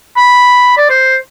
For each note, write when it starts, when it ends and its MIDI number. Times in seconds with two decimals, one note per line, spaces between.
0.16 0.76 83
0.77 0.85 74
0.89 1.16 72